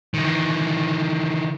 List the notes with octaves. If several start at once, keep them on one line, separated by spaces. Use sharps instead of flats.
D#3 E3